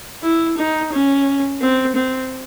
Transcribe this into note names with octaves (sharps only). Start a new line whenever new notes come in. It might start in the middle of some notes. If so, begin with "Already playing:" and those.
E4
D#4
C#4
C4
C4